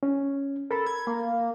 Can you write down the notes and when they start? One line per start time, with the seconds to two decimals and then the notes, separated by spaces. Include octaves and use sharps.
0.03 C#4
0.71 A4 A#4 B5
0.87 G#6
1.07 A#3